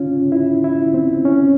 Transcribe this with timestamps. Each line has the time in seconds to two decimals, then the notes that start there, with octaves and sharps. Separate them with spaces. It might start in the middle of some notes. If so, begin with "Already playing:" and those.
Already playing: C#4 F4
0.32 E4
0.64 E4
0.94 C4
1.25 C#4